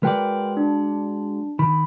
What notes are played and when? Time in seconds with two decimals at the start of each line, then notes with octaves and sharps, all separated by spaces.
0.03 G#3 F#4 A#4 B4 D5 G5
0.57 D4
1.59 D#3 B5